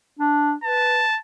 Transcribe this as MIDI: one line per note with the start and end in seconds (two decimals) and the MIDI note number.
0.19 0.54 62
0.64 1.03 71
0.64 1.18 81